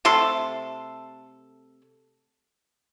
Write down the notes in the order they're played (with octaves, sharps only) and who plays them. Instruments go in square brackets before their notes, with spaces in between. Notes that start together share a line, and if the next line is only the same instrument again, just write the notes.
[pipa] C3 A3 A4 C6